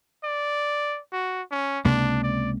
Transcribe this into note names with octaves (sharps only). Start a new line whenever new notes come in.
D5
F#4
C#4
C#2 C3 A#3 D4
D5